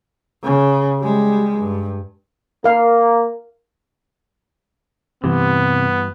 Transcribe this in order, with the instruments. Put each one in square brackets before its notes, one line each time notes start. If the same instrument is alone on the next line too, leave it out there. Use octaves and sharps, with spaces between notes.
[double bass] C#3
G3 G#3
G2
[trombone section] A#3 [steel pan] A#4 F5
[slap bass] G2 E3 [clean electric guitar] C3 [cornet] B3